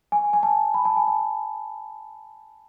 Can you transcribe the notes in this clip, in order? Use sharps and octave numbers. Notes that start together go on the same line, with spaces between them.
G#5
G#5
A5
B5
A5
G#5
A5